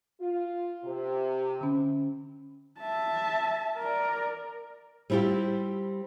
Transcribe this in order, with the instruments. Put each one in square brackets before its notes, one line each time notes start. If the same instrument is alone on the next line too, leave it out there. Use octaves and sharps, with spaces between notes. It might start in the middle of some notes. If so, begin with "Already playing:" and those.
[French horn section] F4
C3
[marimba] D3 C#4
[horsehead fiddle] E5 A5
A#4 D5
[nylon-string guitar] G3 C4 E4 F4 G4